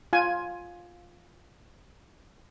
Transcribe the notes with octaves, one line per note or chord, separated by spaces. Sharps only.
F4 G#5